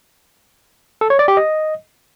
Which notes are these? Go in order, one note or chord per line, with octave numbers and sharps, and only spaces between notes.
A4
C#5
D5
G4
D#5